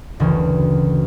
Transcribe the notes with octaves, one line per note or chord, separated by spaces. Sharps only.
F#1 D2 E3